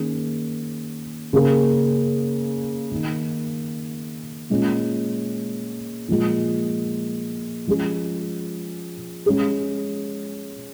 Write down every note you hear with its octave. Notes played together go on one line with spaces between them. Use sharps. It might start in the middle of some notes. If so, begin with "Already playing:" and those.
Already playing: D#3 A#3 C#4 G#4
C#3 A#3 C#4 G#4
D#3 A#3 D#4
A#2 G#3 C#4
A#2 F3 G#3
F3 G#3 C#4 F4 G#4
G#3 C#4 G#4